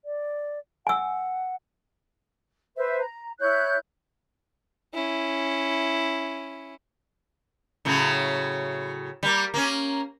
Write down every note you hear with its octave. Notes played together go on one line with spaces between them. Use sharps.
D5
F#5 G#5 E6
B4 C5 E5
A#5
E4 C#5 F#6 G6
C#4 E4
A2 C#3 F#3
G3 A#3
A#3 C#4